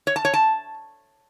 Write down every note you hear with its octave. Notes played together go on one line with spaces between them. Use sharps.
C#5
A5
C#5
A5